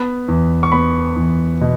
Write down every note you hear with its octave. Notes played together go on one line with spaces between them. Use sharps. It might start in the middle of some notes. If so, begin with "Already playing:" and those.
Already playing: B3 B5
E2
C#6
B3 B5
E2
B2